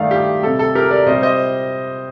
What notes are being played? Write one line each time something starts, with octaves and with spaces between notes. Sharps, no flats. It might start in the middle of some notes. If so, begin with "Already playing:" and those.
Already playing: G2 D#3 A3 D5 F5
G4
C3 G3 A4
A4
G4 A#4
A#4 D5
C3 G3 C5 D#5
C5 D#5